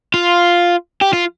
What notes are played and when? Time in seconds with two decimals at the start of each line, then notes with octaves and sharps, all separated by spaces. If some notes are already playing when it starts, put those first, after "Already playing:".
0.14 F4
1.02 G4
1.13 F4